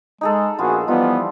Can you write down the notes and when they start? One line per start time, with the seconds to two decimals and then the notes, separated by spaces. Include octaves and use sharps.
0.21 G#3 D#4 G#4 A4
0.59 A#1 B3 F4 F#4 G#4
0.87 E3 F3 G3 B3 D#4 F4